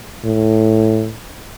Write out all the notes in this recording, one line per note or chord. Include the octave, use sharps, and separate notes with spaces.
A2